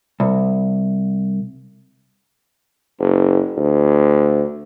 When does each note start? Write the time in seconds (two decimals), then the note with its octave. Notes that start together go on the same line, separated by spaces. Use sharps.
0.20 C2
2.99 F#1
3.57 D2